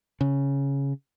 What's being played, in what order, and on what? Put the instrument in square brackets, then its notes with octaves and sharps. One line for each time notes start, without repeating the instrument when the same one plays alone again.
[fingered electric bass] C#3